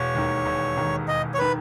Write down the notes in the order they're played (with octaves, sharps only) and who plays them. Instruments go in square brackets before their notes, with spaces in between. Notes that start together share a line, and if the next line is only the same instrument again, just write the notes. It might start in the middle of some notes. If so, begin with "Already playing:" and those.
Already playing: [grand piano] E1 [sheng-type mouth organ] C#5
[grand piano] D#2 D#3
E1
D#2 D#3
[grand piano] E1 [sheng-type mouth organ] D#5
[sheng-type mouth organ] C#5
[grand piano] D#3 [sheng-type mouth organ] B4